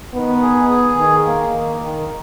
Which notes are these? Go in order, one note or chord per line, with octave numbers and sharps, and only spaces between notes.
D#3 B3
G#4
G#4
D#3
A#3
D#3
D#3